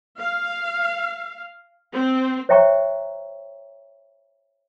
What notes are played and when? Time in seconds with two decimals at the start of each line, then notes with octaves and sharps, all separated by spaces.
0.20 F5
1.93 C4
2.49 C5 C#5 E5 G5 A#5 C#6